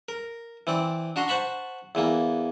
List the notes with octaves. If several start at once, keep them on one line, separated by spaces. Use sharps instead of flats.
A#4
E3 C4 D5
D4 F#4 A#5 C6
C5 F#5 A5 B5 C#6
E2 E3 A#3